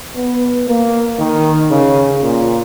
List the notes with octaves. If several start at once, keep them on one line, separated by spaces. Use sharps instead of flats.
B3
A#3
D#3
C#3
A#2